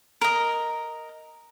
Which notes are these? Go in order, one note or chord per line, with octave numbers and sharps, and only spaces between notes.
A#4 D#5